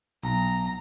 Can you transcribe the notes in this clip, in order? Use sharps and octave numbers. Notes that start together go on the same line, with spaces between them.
B1 A#5